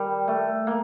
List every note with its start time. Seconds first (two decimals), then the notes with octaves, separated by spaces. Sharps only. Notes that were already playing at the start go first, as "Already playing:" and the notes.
Already playing: D#3 G3
0.28 A3
0.67 A#3